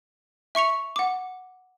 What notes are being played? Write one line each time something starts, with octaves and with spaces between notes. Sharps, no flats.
E5 C#6 C#7 F7
F#5 D6